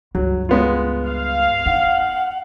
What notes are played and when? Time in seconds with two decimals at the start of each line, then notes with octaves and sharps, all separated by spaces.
0.15 C#2 G2 F#3
0.49 G#3 B3 F4
1.08 F5
1.66 D#4 F#5